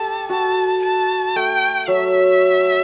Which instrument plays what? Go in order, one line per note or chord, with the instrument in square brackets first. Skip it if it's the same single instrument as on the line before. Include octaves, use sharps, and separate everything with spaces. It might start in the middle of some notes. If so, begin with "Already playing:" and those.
Already playing: [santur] G4 A4 [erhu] A5
[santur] F#4 [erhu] A5
[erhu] A5
[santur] A3 [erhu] G5
[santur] F#3 [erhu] E5